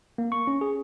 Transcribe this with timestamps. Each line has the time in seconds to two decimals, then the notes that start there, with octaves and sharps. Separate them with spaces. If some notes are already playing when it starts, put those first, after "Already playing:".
0.18 A#3
0.32 C#6
0.47 C#4
0.61 G#4